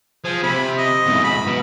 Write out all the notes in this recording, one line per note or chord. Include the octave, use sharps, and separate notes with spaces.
F3 G#4
C3 B5
D#5
E2 G#2
B5
B2